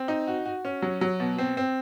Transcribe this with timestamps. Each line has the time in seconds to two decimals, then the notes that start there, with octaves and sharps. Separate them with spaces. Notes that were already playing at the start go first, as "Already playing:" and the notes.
Already playing: C4
0.08 D#4
0.27 F#4
0.45 F#4
0.65 C#4
0.82 F#3
1.01 F#3
1.20 B2
1.38 C4
1.57 C4